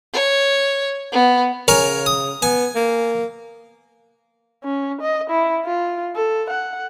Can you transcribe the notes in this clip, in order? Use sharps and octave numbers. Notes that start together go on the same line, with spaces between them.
C#5
B3
C#3 A#4 C#5 G#5
D#6
B3 G#5
A#3
C#4
D#5
E4
F4
A4
F#5